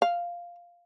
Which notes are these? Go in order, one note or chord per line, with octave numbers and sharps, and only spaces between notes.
F5